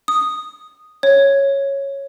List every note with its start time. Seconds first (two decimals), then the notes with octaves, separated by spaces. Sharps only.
0.08 D#6
1.03 C#5